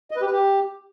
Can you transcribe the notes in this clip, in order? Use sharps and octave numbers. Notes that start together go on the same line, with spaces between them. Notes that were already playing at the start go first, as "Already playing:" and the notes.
D#5
B4
G4
B4
G4